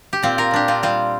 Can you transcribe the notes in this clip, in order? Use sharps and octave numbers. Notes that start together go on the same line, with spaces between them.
G4
A#2 C4 F4
F4 A#4
A#2 D4 G4
C4 F4
G3 C4 F4